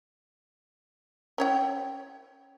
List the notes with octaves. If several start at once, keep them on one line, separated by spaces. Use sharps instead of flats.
C#4 C#5 G5